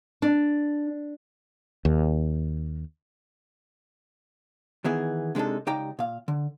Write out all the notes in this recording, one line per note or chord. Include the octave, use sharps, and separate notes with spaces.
D4
D#2
D#3 E3 B3 G#4
C3 G#3 D4 D#4 A4
C#2 D#4 G4 D5 G5 A#5
A#2 F5
D3